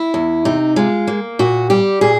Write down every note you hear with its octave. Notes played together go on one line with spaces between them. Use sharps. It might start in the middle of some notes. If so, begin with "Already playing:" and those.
Already playing: E4
E2
C3 D#4
G#3 F4
A#3
A#2 F#4
G3 G4
A#2 G#4